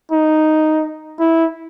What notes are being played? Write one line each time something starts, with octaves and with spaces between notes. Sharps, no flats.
D#4
E4